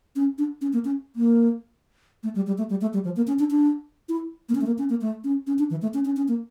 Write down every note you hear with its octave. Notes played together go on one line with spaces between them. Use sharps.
C#4
D4
C#4
A#3
C#4
A#3
A3
G3
G3
A3
G3
A3
G3
F3
A#3
C#4
D4
D4
E4
A#3
C#4
A3
A#3
C#4
A#3
A3
C#4
C#4
D4
E3
A3
C#4
C#4
C#4
A#3